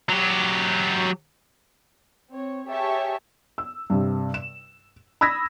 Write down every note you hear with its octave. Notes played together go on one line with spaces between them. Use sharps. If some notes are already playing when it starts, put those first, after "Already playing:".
F#3 G4
C4 C#5
G4 G#4 C#5 E5 A5 C#6
E6
G2 C3
E7
B5 D#6 E6 G#6 A#6 B6